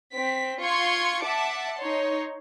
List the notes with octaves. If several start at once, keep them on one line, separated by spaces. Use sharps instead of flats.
C4 B6
F4 C6 C#6 G#6 C#7
E5 F#5 A5 D6
D#4 C#5 C6